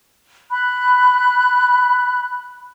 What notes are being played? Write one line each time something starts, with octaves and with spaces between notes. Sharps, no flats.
B5 F#6